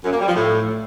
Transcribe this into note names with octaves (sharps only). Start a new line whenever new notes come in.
F#2
A#3
G3
F3
A2